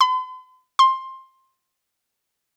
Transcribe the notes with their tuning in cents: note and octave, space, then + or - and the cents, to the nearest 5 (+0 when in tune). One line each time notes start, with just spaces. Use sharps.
C6 -45
C6 +15